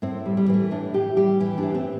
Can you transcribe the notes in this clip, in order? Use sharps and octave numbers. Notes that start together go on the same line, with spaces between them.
A2 C4
G3
G3
E3 C4
A3
A2 D4
A2 G4
G3 G4
E3 G4
A2 D4
C4